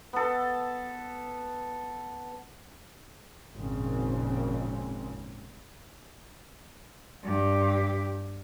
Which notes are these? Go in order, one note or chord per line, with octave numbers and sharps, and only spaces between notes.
B3 A4
G#1 F2 A#2 C#3 G#3 C4
G2 G4